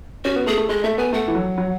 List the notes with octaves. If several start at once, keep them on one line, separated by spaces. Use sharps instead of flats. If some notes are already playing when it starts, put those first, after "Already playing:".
C#4 F#4
B3
A3 G#4
A3
G#3 D#5
A3 E5
B3 G#5
A3 F#5
E3
F#3
F#3